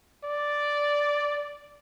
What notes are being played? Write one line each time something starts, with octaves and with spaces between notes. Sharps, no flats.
D5